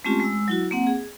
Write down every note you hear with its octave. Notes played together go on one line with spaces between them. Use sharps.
G#3 A3 C4 C#4 F4 G4
G#3 E6
F#3 E4 F#4
A#3 C4 F#5
G#4